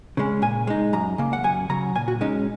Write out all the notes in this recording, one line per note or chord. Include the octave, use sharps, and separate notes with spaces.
C#3 G#3 C#4
A#2 G#5
G#3 D#4
F#2 A#5
C#3 A#3
F#5
F#2 G#5
C#3 F#3 A#5
A#2 G#5
F#4
G#3 C#4 D#4